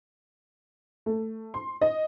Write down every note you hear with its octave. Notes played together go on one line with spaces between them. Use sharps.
A3
C6
D#5